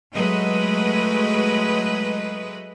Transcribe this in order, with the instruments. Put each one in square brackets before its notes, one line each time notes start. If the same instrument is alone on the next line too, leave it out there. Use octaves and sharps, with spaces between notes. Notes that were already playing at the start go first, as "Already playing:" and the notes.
[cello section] F#3 G#3 A3 B4 D#5